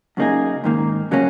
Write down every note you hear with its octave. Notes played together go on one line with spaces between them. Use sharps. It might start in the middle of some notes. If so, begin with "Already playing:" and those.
F#2 C#3 A#3 D#4 G#4
G#2 D#3 A#3
C#3 F#3 A#3 C#4